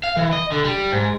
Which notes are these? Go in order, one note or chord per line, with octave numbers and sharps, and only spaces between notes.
F5
E3
D#5
D3
G3
G#2